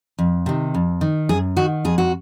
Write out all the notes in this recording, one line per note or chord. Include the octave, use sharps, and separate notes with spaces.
F2
C3 D#3
F2
D#3
F#2 G#4
D#3 F#4
F2 G#4
F#4